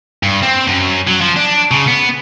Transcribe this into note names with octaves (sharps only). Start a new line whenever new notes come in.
G2
C4
F#2
F#3
F3
D4
C#3
B3